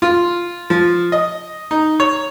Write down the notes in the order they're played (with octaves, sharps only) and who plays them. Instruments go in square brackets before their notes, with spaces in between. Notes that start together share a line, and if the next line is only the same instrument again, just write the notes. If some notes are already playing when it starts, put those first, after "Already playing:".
[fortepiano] F4
F3
D#5
D#4
C#5